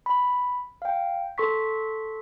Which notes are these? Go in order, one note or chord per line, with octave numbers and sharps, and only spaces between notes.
B5
F5 G5
A4 C6 C#6 B6